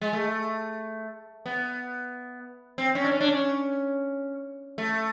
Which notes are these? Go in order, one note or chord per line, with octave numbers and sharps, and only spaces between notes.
G#3
A3
B3
C4
C#4
D4
C#4
D4
C#4
A3